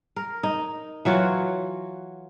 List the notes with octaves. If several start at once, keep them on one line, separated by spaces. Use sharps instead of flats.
A#4
D#4
E3 F#3 F4 F#4